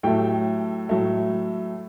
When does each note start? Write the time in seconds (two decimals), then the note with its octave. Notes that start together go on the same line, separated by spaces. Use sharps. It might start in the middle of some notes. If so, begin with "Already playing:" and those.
0.03 A2 F#3 A3 G4 G5
0.89 A2 F#3 A3